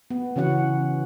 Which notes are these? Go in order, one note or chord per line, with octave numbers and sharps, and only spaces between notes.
B3
C#3 E3 C#4 F#4 F#5